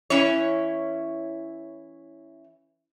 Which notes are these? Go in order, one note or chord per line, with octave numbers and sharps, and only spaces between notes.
E3 C#4 E4 C#5